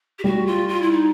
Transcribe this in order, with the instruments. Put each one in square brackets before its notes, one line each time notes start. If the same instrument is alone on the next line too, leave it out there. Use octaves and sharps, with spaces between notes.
[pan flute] G4
[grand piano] G3 [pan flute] F#4
[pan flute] F4
F4
E4
D#4